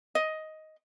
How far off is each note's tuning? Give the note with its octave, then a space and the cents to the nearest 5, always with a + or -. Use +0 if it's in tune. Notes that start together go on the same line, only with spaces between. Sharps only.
D#5 +10